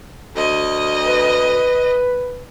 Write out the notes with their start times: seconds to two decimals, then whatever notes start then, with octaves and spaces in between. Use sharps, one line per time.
0.36 D2 D#5
1.06 B4